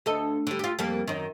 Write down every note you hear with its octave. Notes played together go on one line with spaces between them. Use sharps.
D2 A4 D#5
D3 G3
F4 G4
F2 G3 A#3
F#2 D#3